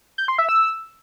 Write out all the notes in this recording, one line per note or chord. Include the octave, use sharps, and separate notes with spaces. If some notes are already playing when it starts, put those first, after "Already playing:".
G6
C6
E5
E6